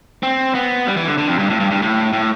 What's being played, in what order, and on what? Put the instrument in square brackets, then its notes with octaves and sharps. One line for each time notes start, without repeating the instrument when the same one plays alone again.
[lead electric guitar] C4
B3
G3
E3
D3
D3
F2
G2
A2
G2
G2
A2
A2